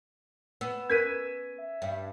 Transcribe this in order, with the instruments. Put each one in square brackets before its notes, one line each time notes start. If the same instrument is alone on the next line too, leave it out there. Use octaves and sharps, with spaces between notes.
[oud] B3 [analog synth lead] E6
[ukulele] C#4 A#4 B4 [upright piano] G#6 B6 D#7
[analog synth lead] E5
[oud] G2